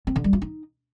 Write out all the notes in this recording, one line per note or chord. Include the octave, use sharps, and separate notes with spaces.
C4
D3
G3
F4
D#4